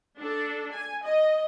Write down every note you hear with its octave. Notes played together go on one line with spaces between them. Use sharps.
D4 A4
G#5
D#5